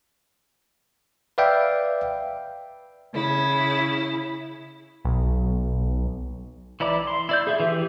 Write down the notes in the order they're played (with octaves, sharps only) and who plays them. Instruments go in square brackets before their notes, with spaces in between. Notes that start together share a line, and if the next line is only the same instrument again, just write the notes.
[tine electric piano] B4 D5 E5 F5 G5
[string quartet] C#3 E4
[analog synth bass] B1
[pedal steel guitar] E3 E4 D5 A#5 D6
C6
E4 D5 G6
G#4 E5
E3 G4